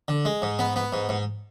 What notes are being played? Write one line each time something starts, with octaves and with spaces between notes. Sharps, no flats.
D3
G#3
G#2
B3
B3
G#2
G#2